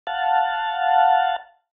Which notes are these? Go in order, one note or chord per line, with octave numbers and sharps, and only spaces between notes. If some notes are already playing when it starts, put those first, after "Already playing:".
F5 F#5 A5